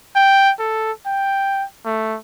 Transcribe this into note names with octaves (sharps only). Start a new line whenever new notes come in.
G5
A4
G5
A3